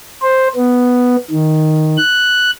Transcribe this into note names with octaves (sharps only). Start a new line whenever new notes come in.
C5
B3
D#3
F#6